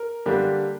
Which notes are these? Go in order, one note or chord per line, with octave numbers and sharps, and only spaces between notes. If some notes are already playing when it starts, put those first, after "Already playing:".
Already playing: A#4
D3 G3 A#3 D4 G4